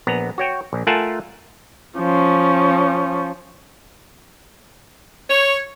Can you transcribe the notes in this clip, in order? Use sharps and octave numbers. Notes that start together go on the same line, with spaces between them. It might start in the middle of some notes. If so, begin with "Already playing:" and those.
A#1 B3 A#5
F#4 C#5 G5
A#1
A3 F4 A#4 F#5 G#5 A5
F3 C#4
C#5